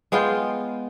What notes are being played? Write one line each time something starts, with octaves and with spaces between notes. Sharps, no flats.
G#3 B3 F4 G5